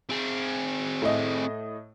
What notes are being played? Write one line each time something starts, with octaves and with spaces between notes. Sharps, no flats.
C4 G#4
A2 A3 D#5